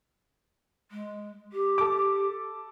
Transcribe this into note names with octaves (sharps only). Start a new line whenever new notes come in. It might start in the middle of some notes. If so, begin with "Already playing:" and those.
G#3
G4
A4 D6